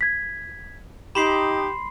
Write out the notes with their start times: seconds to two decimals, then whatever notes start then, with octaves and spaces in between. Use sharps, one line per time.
0.01 G#6 B6
1.15 D#4 G4 B5 C6 C7 E7